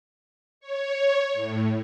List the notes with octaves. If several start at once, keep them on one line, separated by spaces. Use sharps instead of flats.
C#5
A2